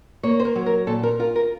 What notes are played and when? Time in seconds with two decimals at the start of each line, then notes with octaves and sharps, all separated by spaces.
0.23 A#3 C#5
0.40 C5
0.45 A#4
0.55 F#3
0.66 A#4
0.87 A#2 A4
1.03 A#4
1.19 F4 A#4
1.36 A#4